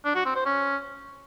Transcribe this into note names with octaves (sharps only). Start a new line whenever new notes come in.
D4
F#4
C4
C5
C#4